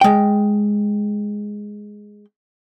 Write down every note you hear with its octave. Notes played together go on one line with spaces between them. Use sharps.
G#3 G5